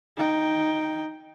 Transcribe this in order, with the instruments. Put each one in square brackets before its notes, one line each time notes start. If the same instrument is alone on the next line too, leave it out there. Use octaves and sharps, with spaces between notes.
[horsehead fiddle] D#4 G5